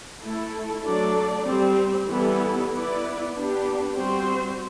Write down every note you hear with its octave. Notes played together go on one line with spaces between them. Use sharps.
A3 E4 A4
F#3 A3 D4 A4 D5
G3 C4 G4
E3 G3 B3 E4 A4
B3 E4 B4 D5
B3 D4 G4
G3 C4 F#4 C5